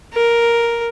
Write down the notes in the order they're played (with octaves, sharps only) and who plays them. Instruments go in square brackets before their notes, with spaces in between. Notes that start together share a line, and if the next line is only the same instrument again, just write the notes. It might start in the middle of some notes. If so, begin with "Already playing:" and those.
[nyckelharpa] A#4